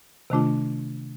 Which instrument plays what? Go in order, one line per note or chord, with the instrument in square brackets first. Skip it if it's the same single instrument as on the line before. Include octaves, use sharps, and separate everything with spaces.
[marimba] C3 D#3 A3 D4 F4